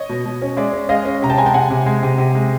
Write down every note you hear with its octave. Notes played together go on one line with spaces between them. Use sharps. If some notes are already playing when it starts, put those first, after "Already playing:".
Already playing: C#5 D#5
B2
B2
C#4
G#3 D5 E5
C#4
G#3 D#5 F5
C#4
C3 A#5
G5 A5
G#3 G#5 A#5
G5 A5
C3 F#5 G#5
C3
G#3
C3
C3
G#3